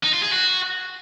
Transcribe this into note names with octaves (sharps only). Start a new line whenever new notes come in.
D#4
F4
G#4
F#4